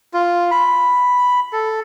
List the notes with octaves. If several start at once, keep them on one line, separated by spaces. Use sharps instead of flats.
F4
B5
A4